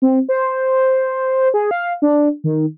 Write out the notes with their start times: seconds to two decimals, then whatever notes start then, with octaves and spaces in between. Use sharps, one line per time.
0.02 C4
0.29 C5
1.54 G#4
1.71 F5
2.02 D4
2.44 D#3